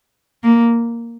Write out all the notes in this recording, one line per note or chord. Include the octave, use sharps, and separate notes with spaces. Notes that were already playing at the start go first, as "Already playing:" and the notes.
A#3